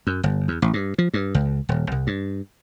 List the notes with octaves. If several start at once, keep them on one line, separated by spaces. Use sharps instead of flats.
F#2
G1
E2
A1
G2
F3
G2
C#2
D#1
C2
G2